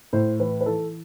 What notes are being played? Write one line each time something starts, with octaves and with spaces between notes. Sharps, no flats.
A2 C5
E3 B4
B4
E3 A4